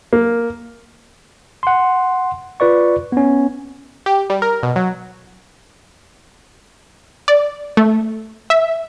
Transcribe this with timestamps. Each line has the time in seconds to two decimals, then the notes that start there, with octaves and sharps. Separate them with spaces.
0.13 A#3
1.63 F#5 C6
2.60 F4 B4 D5 C#6
3.12 B3 C#4
4.06 G4
4.30 G3
4.42 A#4
4.63 B2
4.76 F#3
7.28 D5
7.77 A3
8.50 E5